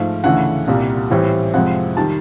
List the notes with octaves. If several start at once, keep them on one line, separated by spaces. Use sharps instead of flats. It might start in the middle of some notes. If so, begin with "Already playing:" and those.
Already playing: G#2 F3 A3 F5
D2 C#3 E3 A3 F#5
C2 A#2 G3 A#3
A2 E3 G3 C4
F2 C3 F3 G#3 C4 F#5
D#3 G3 A5